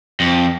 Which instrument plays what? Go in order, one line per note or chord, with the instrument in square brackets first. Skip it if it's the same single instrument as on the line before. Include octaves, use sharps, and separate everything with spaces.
[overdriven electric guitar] F2